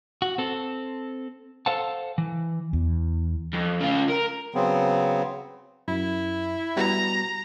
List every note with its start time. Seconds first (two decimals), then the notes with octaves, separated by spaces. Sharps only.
0.22 F#4
0.38 C4 A4
1.66 A4 C5 F5 F#5 A5
2.18 E3
2.73 E2
3.53 F2
3.81 C#3 F4
4.09 A#4
4.54 C#3 F#3 B3 C4
5.88 F#2 E4
6.77 G3 B3 F#4 A#5